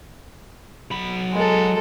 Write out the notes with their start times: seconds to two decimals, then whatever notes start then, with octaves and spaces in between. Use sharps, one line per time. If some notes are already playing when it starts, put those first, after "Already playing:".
0.91 F#3 B5
1.33 G#3 A4